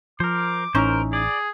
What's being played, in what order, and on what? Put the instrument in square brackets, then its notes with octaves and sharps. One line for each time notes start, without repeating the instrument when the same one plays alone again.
[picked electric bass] F3 [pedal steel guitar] A#4 C5 [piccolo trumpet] D6
[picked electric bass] A1 [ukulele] C#4 D#4 E4 [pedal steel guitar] A#4 C5
[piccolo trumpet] G#4 [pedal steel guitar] D5